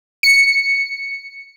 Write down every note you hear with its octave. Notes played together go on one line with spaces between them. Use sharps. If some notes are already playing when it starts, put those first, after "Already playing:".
C#7